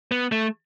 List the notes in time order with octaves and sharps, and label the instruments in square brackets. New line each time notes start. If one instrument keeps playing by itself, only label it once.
[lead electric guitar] B3
A3